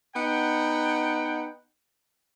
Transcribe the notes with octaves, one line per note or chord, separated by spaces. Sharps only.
B3 D#4 F#5 G5